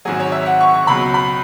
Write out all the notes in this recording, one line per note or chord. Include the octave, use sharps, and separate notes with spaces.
G#1 G#2 F#3 G#4
C#5
E5
F#5
C#6
C#6
C#2 B2 F#3 B5
B5